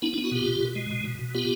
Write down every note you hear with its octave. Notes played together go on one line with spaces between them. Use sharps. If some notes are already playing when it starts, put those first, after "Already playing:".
B3 D4 E4
D4 E4
B3
E4 F#4
B2 F4 G4
B2
B2
G#3
B2
B2
B2
B3 F4 G4